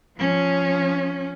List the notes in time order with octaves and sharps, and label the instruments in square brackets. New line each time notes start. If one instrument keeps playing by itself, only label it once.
[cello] F3 C#4